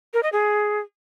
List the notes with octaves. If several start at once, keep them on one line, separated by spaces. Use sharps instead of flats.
A#4
D#5
G#4